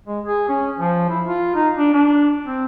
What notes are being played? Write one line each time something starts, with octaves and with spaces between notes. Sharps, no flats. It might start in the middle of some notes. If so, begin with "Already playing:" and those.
G#3
G#4
C#4
F3
E4
F4
D#4
D4
D4
C4